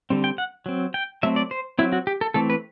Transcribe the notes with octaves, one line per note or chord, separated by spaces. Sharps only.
D3 G3 C4
G5
F#5
F#3 C4
G5
F#3 A3 C4 E5
D5
C5
F#3 C4 E4
F#4
G4
A4
E3 A3 C4 A4
B4